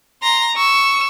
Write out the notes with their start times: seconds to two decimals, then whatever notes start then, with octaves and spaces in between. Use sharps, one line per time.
0.22 A#5 C6
0.55 C#6 E6